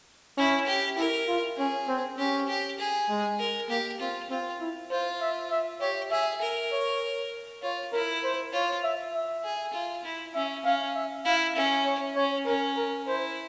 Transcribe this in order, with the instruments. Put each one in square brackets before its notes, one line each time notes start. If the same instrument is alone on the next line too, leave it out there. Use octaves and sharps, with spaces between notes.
[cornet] C#4 [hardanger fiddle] E4
[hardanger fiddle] G4
[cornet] E4 [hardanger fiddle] A#4
[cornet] F4
[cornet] C#4 [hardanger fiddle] G#4
[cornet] C4
[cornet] C#4 [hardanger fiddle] G4
[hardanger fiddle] G4
G#4
[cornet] G#3
[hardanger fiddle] A#4
[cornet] A#3 [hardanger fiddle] G4
[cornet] C4 [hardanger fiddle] F4
[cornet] C4 [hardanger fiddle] F4
[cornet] E4
[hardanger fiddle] F4 [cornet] C5
[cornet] E5
E5
[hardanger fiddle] G4 [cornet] C#5
[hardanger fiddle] G#4 [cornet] E5
[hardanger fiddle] A#4
[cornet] C#5
[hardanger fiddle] F4 [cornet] C#5
[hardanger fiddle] E4 [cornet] A#4
[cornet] C5
[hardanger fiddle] F4 [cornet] C#5
[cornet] E5
E5
[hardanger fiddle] G#4
F4
E4
[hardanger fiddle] C#4 [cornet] E5
[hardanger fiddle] C#4 [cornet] F5
[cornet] E5
[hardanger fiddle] E4 [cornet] F5
[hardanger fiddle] C#4 [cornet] E5
[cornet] C#5
[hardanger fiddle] C#4 [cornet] C#5
[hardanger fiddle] C#4 [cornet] A#4
[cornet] A#4
[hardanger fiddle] E4 [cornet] C5